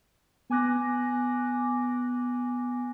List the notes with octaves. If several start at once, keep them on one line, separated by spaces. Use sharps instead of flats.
B3 G#5 D6 F#6 A#6